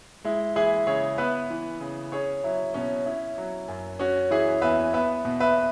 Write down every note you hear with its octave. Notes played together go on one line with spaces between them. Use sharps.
G#3 E4
E3 E4 G#4
C#3 G#4 C#5
B3 B4 E5
E3
C#3
C#4 G#4 C#5
F#3 E4
B2 C#4
C#4 E4
F#3
F#2
C#4 F#4
E3 E4 G#4
E2 B4 E5
B3 B4 E5
B2
B4 E5